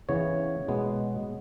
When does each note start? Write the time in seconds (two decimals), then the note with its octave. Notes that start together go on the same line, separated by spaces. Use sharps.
0.09 C#3 E3 B3 C#5
0.68 B2 G#3 B3